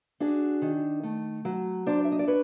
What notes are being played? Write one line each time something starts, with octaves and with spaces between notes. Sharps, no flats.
D4 F#4 G#4
D#3
A3
F#3
D4 C5 D5
E5
D#5
D5
B4 C#5